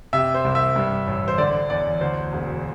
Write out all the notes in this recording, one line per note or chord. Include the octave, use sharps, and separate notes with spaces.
C3 E5
C5
C2
E5
G2
A1
C5
D3 D5
E2 D5
D2 C5
E1